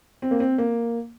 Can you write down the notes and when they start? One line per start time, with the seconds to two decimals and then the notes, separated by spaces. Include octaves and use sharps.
0.22 C4
0.31 A#3
0.40 C4
0.58 A#3